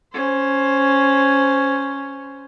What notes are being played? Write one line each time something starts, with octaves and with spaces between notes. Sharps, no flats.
C#4 C5